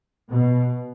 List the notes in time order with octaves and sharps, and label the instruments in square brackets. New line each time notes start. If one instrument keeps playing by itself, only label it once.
[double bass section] B2